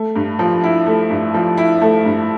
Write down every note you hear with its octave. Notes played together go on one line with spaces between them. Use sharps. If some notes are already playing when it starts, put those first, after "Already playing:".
Already playing: A3
G2
F3
E4
A3
G2
F3
E4
A3
G2